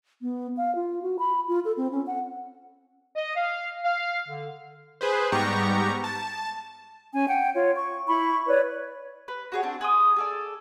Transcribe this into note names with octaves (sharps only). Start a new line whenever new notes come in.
B3
F5
F4
F#4
B5
F4
A4
C4
C#4
F#5
D#5
F5
F5
D3
G#4 B4 C5
G#2 G3 B3 G4 A#5 C#6
A5
C#4 G#5
F#5 G5
F4 C#5
C#6
E4 B5 C#6
B4 C#5 D5
B4
F#4 G#4 C#5
C4 D4
G#4 C6 D#6
G#4 A4 D5